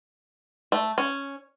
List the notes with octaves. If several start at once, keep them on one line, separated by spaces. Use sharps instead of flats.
A3
C#4